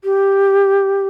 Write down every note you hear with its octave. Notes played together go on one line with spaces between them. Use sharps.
G4